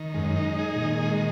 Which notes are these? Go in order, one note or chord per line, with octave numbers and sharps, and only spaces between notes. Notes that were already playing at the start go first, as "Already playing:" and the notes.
Already playing: D#3
F#2 G#3
D#4
G#4
A#2
D#3
G#3